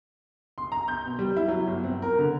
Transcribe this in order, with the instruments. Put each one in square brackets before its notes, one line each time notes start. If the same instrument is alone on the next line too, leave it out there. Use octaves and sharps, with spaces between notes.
[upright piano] C6
A#5
G6
B2
G3
E4
F#3
G1
C4
A#4
D3